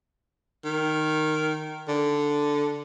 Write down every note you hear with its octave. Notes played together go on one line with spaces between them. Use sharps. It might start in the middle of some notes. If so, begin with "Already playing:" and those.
D#3
D3